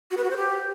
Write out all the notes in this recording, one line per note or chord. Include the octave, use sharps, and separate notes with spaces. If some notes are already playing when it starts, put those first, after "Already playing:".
F#4
B4
F#4
C5
G4